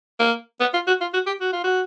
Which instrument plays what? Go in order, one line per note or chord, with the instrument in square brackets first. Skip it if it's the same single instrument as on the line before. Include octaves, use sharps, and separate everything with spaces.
[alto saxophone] A#3
B3
F4
F#4
F4
F#4
G4
F#4
F4
F#4